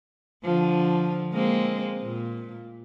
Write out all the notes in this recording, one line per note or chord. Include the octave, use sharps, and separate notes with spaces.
D3 F3
G#3 A#3 C4
A#2